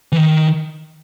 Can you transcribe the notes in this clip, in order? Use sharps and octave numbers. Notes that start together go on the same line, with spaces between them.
E3
D#3